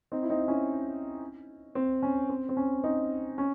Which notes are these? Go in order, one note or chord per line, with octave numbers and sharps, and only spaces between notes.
C4 D#4
E4
C4 D#4
C#4 E4
C4
C#4
C4
C4
C#4
C4 D#4
C#4